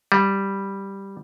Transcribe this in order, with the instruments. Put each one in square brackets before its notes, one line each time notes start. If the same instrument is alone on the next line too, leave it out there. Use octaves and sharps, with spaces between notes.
[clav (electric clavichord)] G3